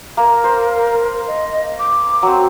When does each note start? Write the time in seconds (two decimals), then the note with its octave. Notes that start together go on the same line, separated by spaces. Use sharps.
0.17 A#3 A#4
0.44 C5
1.27 D#5
1.79 D6
2.23 F#3 C4